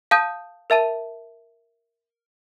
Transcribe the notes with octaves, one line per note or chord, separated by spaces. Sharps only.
F5 A5 D#6 G6 D#7
A#4 E5 A5 D#7